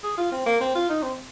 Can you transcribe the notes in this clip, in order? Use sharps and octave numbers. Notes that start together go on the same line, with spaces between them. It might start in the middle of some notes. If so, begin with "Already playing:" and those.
G#4
F4
C4
A#3
C4
F4
D#4
C4